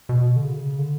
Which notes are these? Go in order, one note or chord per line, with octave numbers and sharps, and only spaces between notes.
B2
D3
C#3
D3